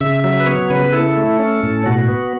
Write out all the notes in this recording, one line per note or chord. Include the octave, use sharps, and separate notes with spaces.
C#3 E5
F#3 E5
B4
B3 C#5
C#3 B4
E4 A4
A3
C#4
A2
B2 F#4
B3